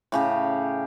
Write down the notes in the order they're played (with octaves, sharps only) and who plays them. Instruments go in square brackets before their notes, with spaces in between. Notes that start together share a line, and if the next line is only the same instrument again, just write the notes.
[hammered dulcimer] A2 C#3 G4